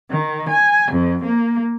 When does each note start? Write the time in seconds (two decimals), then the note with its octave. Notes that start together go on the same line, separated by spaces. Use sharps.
0.11 D#3
0.51 G#5
0.92 F2
1.26 A#3